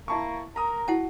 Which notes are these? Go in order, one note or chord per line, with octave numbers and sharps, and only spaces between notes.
A#3 E4 A5 C#6
A#4 A#5 D#6
E4 F#4 F#5 A5